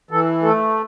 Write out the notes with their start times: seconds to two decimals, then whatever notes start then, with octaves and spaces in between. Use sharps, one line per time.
0.11 E3 A4
0.43 A3 A4